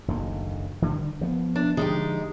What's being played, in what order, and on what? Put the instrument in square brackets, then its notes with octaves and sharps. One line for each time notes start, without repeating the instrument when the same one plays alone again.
[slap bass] F#1 D2 D#3
D3 D#3 G3
F3 B3
[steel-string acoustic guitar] D4
[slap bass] D3 F3 [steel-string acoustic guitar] G#3 D#4 G4